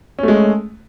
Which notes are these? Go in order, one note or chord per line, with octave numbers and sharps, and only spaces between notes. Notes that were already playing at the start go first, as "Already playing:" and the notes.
G#3 A3 C#4